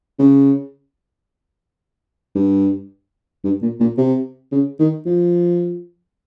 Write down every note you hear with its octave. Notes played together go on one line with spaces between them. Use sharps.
C#3
G2
G2
A#2
A#2
C3
C#3
D#3
F3